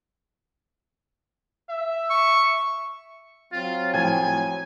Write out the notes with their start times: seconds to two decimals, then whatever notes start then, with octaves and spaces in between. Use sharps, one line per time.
1.69 E5
2.10 C#6
3.53 F#3 C4 F4
3.93 A2 F3 G5 G#5